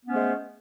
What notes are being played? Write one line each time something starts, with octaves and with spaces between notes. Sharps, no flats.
G#3 A3 B3 C#4 C5